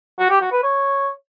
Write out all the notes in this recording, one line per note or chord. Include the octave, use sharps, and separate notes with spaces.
F#4
G4
F#4
B4
C#5